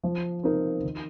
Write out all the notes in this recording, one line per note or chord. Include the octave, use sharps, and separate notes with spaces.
F3
C4 D#4 A#4
D#3